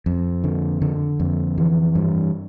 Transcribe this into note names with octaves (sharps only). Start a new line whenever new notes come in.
F2
D3
D3
F2
E3
G2